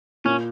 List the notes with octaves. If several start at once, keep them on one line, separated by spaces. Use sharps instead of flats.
A#2 C#4